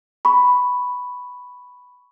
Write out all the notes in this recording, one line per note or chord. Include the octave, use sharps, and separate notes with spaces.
B5 C#6